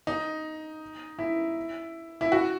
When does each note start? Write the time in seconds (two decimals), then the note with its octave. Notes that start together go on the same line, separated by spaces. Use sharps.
0.07 D#4
1.19 E4
2.21 E4
2.32 F#4